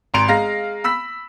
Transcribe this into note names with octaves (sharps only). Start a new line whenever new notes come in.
G#1 A#5 C6 D7 F7
G#3 F5 A#5 A#6
B5 E6 B6